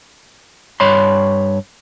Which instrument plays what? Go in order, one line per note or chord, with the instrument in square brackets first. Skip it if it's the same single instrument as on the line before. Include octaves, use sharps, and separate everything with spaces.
[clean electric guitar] G2 C#5 B5 C6